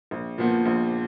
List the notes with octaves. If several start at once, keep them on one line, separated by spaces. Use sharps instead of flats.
A#1
A#2 F3 B3
A#1